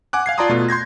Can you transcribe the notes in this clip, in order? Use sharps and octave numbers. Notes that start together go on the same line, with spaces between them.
F#5 G#5 D6 F#6
F5 G#6 C7
F4 D5 A5 A#5 C6 D#6
B2 A3 F4
C6 G6 G#6 A#6